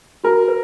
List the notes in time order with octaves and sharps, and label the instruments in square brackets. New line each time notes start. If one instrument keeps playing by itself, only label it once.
[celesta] F#4 [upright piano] A#4
[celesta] B4